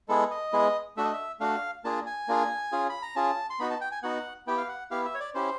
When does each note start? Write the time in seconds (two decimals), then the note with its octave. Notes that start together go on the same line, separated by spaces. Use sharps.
0.08 G#3 B3 E4 G#4 A4
0.31 D#5
0.53 G#3 B3 E4 G#4
0.97 A3 D4 F#4 E5
1.04 D#5
1.13 E5
1.40 A3 D4 F#4 F5
1.84 A#3 D4 F4 G#4 A5
2.06 G#5
2.28 A#3 D4 F4 G#4
2.72 C#4 F4 G#4
2.89 B5
3.02 A#5
3.16 C#4 F4 G#4 A5
3.50 C6
3.59 B3 D#4 F#4 B5
3.70 A5
3.81 G5
3.92 G#5
4.03 B3 D#4 F#4 F#5
4.47 B3 E4 G4 G5
4.57 F5
4.68 F#5
4.91 B3 E4 G4 F5
5.05 E5
5.14 C#5
5.20 D5
5.34 C#4 E4 G4 C5